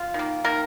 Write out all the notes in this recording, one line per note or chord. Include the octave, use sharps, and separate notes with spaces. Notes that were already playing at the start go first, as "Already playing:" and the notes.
Already playing: F4
D#3 A#3
D#3 A#3 A#4